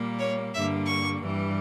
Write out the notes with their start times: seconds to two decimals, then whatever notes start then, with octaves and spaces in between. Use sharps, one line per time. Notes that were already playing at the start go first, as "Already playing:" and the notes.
Already playing: A#2 G3 A#3
0.20 C#5
0.53 G2 D3 G3 A#3 E5
0.86 C#6
1.19 G2 E3 G3